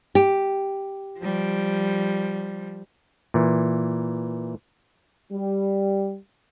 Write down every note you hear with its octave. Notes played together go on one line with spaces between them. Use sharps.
G4
F3 G3
A#2 E3
G3